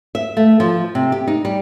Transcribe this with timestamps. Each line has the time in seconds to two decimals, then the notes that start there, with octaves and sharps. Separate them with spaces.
0.15 E5
0.37 A3
0.60 F3
0.95 C3
1.12 G4
1.27 D#4
1.45 G3